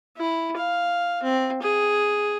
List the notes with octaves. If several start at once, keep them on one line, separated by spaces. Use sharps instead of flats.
E4
F5
C4
G#4